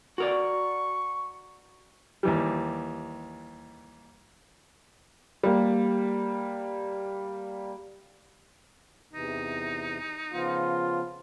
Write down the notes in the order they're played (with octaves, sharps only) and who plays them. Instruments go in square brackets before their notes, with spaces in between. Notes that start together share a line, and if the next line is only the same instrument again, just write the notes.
[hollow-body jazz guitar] F#4 A#4 D5 [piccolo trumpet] C#6
[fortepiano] D#2 E3 G3
[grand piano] G3 A#3
[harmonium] E2 C3 E3 [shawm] D#4
[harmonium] C#3 F3 B3 [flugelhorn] F4